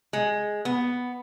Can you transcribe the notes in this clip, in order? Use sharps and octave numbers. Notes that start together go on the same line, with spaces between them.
G#3
B3